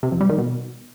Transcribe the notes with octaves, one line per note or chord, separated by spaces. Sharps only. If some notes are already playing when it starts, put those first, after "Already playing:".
C3
F2
G3
D#3
B2